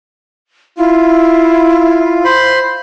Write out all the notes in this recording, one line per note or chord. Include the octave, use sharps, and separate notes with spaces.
E4 F4
C5 B5 C6